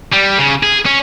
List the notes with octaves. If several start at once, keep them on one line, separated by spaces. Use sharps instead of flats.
G3
C#3
G#4
C#4